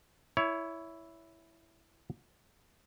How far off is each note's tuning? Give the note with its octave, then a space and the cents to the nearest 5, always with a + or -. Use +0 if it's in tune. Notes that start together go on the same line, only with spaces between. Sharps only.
E4 +0 C#5 +20